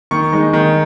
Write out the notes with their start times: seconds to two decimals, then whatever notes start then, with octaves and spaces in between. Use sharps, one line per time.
0.11 D#3 C#6
0.33 G#3 D#4
0.53 D#3